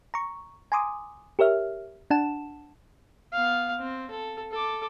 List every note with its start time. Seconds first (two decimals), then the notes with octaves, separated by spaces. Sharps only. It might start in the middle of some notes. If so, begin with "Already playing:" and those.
0.14 A#5 C#6
0.72 G#5 A#5 C6 D6 D#6
1.39 G4 A#4 C#5 E5 F6
2.10 D4 F#5 A5 E7
3.33 B3 F5
3.78 C4
4.10 A4
4.51 A4 D6